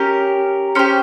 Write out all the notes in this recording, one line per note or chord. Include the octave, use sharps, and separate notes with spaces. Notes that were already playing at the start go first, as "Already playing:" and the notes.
Already playing: C#4 G4 A#4
C#4 G4 C5